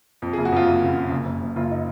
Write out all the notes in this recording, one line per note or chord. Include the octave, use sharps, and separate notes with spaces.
F2
G#4
F#1
F#4
F2 F4
F#1
C#3
C#3
F#1
F#1
F#1
F#1 F4
D#4